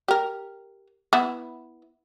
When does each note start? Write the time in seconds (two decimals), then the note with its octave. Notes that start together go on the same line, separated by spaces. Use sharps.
0.08 G4 A#4
1.13 B3 E4